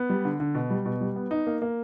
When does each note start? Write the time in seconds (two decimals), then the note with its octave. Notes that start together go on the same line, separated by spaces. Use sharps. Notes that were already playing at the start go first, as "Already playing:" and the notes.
Already playing: B3
0.10 G3
0.25 D3
0.40 D3
0.55 B2
0.70 G3
0.86 B2
1.01 G3
1.16 B3
1.31 D#4
1.47 A#3
1.62 A#3